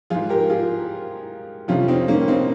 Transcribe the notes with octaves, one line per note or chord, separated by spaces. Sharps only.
G#2 F3 F4 G#4
G4 A#4
F4 G#4
F2 C3 F3 C#4 F4
C4 D#4
A#3 C#4
C4 D#4